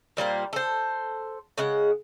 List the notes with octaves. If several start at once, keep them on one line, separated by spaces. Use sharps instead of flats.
A#2 G3 A#3 C5
A4 C5
C#3 G#3 F#5